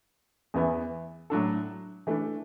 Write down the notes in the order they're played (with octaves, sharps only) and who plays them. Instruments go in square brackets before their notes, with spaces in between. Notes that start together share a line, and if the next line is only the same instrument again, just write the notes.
[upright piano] E2 E3 B3 E4
A2 F#3 D4 A4
E3 A3 D4